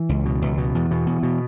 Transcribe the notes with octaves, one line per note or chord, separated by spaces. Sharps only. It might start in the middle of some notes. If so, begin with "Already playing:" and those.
Already playing: E3
C#2
B2
C#2
B2
E2
B2
E2
B2